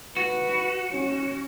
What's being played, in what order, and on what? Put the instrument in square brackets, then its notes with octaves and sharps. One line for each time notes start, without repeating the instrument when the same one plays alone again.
[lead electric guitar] F#4 [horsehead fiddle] B4
[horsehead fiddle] C#4